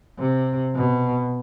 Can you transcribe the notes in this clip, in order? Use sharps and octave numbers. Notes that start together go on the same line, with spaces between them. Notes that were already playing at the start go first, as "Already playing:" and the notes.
C3
B2